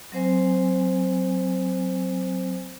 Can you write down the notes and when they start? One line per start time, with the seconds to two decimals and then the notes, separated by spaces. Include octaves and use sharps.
0.12 F#3 C4 C5 G#5